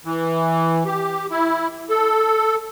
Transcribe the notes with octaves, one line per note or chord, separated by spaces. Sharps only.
E3
G4
E4
A4